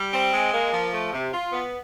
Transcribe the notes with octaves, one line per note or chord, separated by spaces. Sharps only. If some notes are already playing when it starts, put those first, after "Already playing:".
Already playing: G3
C4
G#3
A#3
F3
A3
C3
F4
B3